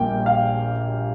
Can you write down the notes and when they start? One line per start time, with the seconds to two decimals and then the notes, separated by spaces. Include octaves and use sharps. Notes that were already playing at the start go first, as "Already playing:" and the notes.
Already playing: A#1 A#2 G3 A#3 G5
0.26 F5